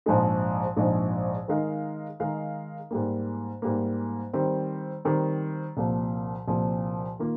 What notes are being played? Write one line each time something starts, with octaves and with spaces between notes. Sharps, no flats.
A#1 G#2 F3 G#3 D#4
A#1 G#2 F3 G#3 D#4
D#3 G#3 D#4 A#4 F5
D#3 G#3 D#4 A#4 F5
G#2 G3 A#3
G#2 G3 A#3
D#3 G3 C4
D#3 G3 C4
C2 A#2 F3
C2 A#2 F3
D#3 A#3 F4